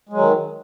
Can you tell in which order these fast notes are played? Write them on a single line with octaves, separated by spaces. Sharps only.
G#3 F#3 D#3